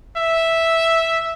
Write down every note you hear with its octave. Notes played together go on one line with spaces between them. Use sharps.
E5